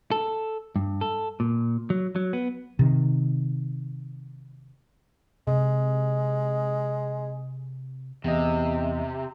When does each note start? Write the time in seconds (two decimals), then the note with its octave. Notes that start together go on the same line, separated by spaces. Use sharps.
0.11 A4
0.76 G2
1.01 A4
1.40 A#2
1.90 F#3
2.16 F#3
2.33 B3
2.79 C3 D#3
5.47 C3 G#3
8.24 E2 C3 D#5